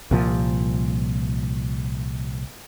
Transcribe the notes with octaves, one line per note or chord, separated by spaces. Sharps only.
C2 A#2 F3